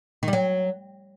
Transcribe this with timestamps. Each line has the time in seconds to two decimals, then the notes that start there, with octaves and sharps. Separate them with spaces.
0.23 D#3
0.28 G3
0.33 F#3